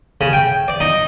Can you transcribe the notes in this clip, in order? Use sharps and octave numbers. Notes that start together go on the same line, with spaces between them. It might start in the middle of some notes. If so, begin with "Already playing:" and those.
C#3
G5
D5
D#4